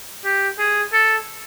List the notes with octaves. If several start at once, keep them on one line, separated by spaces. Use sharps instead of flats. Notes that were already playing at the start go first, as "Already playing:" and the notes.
G4
G#4
A4